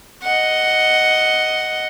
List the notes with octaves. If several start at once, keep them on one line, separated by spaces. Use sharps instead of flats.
D#5 F#5